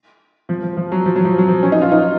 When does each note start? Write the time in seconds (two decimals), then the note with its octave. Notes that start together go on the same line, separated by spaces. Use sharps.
0.49 F3
0.63 F3
0.77 F3
0.92 F#3
1.06 F3
1.16 F#3
1.25 F3
1.38 F#3
1.48 F3
1.63 C#4
1.72 D#4
1.82 F4
1.92 D#4